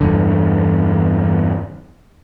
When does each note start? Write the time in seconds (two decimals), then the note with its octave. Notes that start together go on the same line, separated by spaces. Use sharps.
0.01 E2 G2 D3